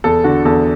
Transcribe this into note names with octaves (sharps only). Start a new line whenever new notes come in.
E2 A4
D3 F#4
E2 A4